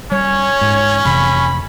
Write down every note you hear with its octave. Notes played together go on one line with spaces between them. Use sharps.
G3 C#4 C#5
G#2
F1 C3 E3 B5